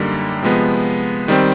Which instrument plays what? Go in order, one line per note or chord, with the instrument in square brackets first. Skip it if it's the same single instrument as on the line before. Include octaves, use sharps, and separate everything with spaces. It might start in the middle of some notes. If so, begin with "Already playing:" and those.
Already playing: [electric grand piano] F#2 D3 G3 A#3 D#4
C3 F3 G#3 B3
D#3 G3 C4